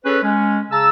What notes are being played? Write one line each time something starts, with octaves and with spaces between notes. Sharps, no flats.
C#4 G#4 A4 B4
G#3 C#4
C#3 A5 A#5 E6